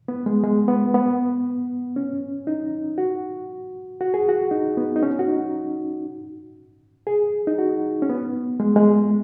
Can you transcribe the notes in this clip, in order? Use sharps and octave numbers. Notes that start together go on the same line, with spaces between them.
B3
G#3
G#3
B3
B3
C#4
D#4
F#4
F#4
G#4
F#4
D#4
B3
D#4
C#4
F#4
D#4
G#4
D#4
F#4
C#4
B3
G#3
G#3